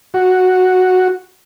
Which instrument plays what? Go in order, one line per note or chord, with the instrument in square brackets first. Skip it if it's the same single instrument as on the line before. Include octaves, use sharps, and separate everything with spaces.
[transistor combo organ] F#4